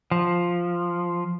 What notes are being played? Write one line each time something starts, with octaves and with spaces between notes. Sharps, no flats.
F3